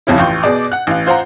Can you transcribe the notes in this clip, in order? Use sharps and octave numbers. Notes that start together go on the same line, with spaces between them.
C2 F2 C#3 C#4 E4
A1 F4 G5 C#6 G6
B2 G#4 D5 D6
F#5 F#6
A1 F5
F4 C5 F5 F#5 A#5